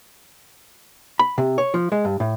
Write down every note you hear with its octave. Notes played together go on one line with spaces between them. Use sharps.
B5
C3
C#5
F3
G#3
G2
A2